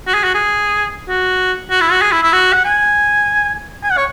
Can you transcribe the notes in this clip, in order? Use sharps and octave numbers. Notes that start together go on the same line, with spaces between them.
F#4
G#4
F#4
G#4
F#4
F#4
E4
F#4
G#4
E4
E4
F#4
F#5
G#5
G#5
F#5
C#5